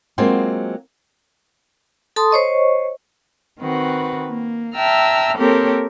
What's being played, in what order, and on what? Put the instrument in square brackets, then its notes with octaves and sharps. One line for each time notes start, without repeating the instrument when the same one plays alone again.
[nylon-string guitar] F#3 G#3 A#3 C4 F4
[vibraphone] A4 A5 C6 D#6
C5 C#5 D#5 C#6
[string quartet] D#3 C4 F#4 B4
A#3
E5 G5 A5 A#5 E6 F6
A#3 C4 G4 A4 A#4 C#5